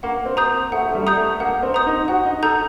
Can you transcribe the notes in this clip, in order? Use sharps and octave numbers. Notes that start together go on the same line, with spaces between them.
A#3 F#5
C4
A#5 D#6 G6
A3 F#5
A3
G3
A#5 D#6 G6
A3
A#3 F#5
C4
A#5 D#6 G6
D#4
F#4 F#5
D#4
A4 A#5 D#6 G6